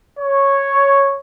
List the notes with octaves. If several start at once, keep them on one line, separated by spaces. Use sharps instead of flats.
C#5